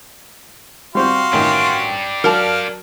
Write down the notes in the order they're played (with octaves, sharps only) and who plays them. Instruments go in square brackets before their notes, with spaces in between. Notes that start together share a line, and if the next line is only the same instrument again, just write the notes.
[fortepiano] G3 C4 G4 [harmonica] F#4 F5 C6
[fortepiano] A1 D#3 [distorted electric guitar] D4 G4
[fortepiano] F#3 [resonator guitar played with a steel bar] A#4 D5 A5 [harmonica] F5